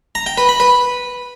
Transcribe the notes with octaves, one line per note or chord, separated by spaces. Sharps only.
A#5
G5
B4
B5
B4